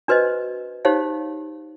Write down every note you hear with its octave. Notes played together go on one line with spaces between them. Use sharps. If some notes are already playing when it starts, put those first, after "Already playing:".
D4 F#4 B4 C5 D#5
D#4 G4 C5 C#5 F5